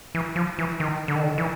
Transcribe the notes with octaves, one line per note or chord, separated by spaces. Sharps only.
E3
F3
E3
D#3
D3
D#3
D3
E3